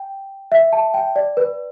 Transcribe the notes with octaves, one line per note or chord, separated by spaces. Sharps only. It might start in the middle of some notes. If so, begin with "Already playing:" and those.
Already playing: G5
E5
A5
G5
D5
B4